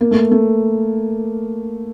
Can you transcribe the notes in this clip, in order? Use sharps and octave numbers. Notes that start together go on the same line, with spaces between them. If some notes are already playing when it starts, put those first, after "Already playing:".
A#3
A3
A3